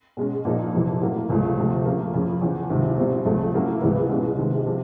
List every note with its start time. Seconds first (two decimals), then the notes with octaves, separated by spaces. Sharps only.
0.17 B2 G#3 C#4
0.45 A#2 F3 A#3 D#4
0.73 F2 C3 E3
1.01 A2 F#3 A#3
1.30 C#2 C3 F3 A3
1.57 D2 C3 F3 A3
1.85 C#3 F3 A#3
2.13 F2 C#3 F3
2.41 E2 C#3 F3
2.70 C#2 C3 D#3
2.98 B2 G3 C4 E4
3.26 C#2 C3 F3 A3
3.54 A2 F#3 A#3 C#4 E4
3.82 C#2 C3 E3 G#3 B3
4.09 C2 B2 G#3 C#4
4.38 C3 D#3 G#3
4.66 C3 F3